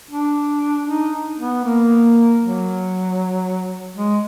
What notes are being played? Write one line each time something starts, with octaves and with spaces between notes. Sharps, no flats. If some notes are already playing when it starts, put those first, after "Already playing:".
D4
D#4
B3
A#3
F#3
G#3